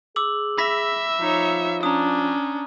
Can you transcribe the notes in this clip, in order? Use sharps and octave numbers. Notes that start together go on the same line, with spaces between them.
G#4 D6 E6 F#7
E5 B5 A#6 B6
F3 D#4 C#5
C#4 D4 A#5 D#6